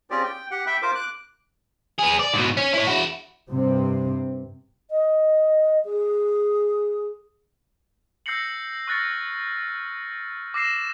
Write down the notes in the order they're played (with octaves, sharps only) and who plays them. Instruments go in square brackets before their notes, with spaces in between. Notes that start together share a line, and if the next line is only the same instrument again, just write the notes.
[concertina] C4 C#4 F4 G4 G#4 D5
G5
G4 F#5
E5 G5 B5
F4 A#4 C5 D6
D6 F#6
[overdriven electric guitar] B3 G#4
D5
G#2 B2
C#4 C#5
E4 C#5
E4 F#4
[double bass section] G2 C3 C4
[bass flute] D#5
G#4
[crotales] E6 G6 A#6 C7 C#7 F#7
C#6 F6 F#6 A6 A#6 C#7
D6 E6 A#6 C7 E7